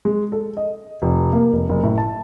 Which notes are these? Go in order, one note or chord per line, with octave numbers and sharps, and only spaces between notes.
G#3
A4
D#5
F1
A#3
F1
F#1
A2
A5